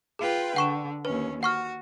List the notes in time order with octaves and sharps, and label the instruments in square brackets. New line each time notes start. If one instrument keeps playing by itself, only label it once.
[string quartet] F4 B4 G5 [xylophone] G#4
[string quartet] D3 [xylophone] F#5 C#6 E7
[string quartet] D#2 C#4 [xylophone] B4
[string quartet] F#4 [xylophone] F#5 C#6 F6